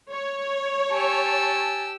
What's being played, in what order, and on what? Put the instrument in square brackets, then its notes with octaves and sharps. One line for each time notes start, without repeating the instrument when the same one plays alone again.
[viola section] C#5
[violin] G4 E6 [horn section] G#5 A5